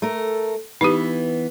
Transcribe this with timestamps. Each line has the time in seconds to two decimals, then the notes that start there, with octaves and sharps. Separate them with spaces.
0.02 A3 A#4
0.81 E3 B3 D#4 G4